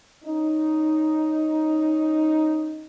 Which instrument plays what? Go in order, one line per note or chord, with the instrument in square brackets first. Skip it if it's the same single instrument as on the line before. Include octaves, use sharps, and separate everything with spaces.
[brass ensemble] C#4 D#4